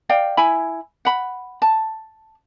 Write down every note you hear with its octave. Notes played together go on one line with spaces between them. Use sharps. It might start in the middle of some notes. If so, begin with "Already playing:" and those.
D5 F5 G5
E4 G#5 B5
F#5 B5
A5